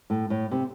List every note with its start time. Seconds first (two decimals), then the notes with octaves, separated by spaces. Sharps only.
0.10 A2
0.30 A2
0.51 C3